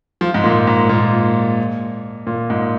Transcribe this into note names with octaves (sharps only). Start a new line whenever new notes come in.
F3
G#2
A#2
G#2
A#2
A#2
G#2